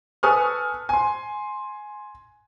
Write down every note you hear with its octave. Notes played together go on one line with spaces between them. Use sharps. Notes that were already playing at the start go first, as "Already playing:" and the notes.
A4 B4 G#5 C#6 D#6 F6
G#5 C6